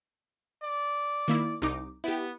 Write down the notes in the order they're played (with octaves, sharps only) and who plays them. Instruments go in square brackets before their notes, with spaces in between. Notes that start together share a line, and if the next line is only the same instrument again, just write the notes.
[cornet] D5
[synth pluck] D#3 A#3 E4
C2 D#4 D6
[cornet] B3 [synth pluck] E4 G4